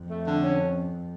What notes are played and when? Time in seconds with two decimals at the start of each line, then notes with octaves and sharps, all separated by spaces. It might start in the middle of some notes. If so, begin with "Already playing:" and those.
Already playing: F2
0.10 A3
0.27 D3
0.43 C#4